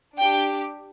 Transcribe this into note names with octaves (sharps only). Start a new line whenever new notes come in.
D4 G4 G5